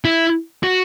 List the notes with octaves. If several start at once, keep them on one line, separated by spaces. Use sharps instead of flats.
E4
F#4